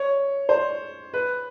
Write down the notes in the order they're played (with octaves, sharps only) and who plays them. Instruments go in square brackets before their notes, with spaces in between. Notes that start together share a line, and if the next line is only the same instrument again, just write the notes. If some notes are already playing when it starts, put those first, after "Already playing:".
Already playing: [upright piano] C#5
C5
B4